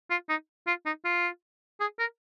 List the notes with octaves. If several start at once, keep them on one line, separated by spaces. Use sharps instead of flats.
F4
D#4
F4
D#4
F4
G#4
A#4